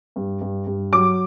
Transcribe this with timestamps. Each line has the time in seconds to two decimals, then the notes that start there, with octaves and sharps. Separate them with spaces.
0.16 G2
0.41 G2
0.67 G2
0.93 F#3 D6